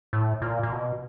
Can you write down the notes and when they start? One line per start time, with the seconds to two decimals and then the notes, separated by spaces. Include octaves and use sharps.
0.13 A2
0.42 A#2
0.63 A#2
0.72 B2